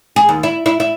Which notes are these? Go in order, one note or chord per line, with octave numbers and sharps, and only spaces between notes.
G#4
D#2
E4
E4
E4